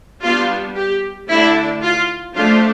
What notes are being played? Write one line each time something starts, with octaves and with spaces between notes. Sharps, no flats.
G3 B3 D4 F4
G4
D3 A3 D4 E4
F4
F3 A3 D4 F4